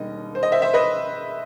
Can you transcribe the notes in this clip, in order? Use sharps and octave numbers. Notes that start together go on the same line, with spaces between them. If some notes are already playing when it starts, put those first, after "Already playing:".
Already playing: E1 D#2 D#3 G3 D#5
C5
D#5
C5 E5
C5 E5
B4 D#5